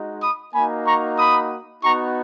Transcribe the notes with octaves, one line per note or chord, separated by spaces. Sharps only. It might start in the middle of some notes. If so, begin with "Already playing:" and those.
Already playing: G#3 D#4 F#4
B5 D#6
A#3 D#4 F#4 G#5 B5
A#5 C#6
B5 D#6
B3 D#4 F#4 A#5 C#6